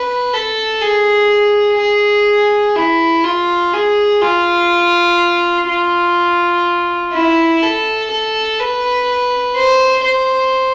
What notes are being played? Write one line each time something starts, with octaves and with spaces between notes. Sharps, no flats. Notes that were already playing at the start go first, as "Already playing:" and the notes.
Already playing: B4
A4
G#4
G#4
E4
F4
G#4
F4
F4
E4
A4
A4
B4
C5
C5